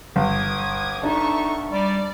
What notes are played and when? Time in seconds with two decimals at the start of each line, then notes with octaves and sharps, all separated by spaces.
0.16 G1 D6 D#6 G#6
1.03 D4 D#4 A4 E5 C#6
1.71 G3 D5